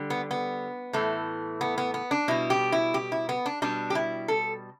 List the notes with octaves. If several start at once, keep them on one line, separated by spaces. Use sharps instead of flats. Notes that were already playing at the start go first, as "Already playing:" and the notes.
Already playing: D3 G3
B3
B3
A2 E3 A3
B3
B3
B3
D4
B2 G3 E4
G4
E4
G4
E4
B3
D4
B2 G3 D4
G4
E4
A4